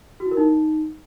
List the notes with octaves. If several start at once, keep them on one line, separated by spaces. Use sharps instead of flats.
F#4
E4
A#4
D#4